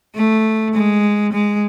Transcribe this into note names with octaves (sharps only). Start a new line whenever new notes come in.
A3
G#3
G#3